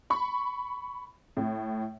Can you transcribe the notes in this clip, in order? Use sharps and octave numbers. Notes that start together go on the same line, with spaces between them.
B5 C#6
A2